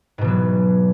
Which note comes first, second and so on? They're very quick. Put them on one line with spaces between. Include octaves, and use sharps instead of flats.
G#2 B2 E3 F#3